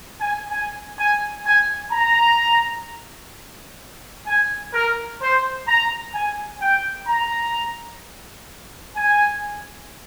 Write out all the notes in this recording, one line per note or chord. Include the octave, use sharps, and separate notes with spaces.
G#5
G#5
G#5
G#5
A#5
G#5
A#4
C5
A#5
G#5
G5
A#5
G#5